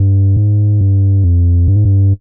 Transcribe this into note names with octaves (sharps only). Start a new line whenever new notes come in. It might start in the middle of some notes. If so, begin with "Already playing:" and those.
Already playing: G2
G#2
G2
F2
G2
G#2
G2